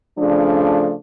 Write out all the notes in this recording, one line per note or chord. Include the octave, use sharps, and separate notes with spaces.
C#3 F3 A3 D4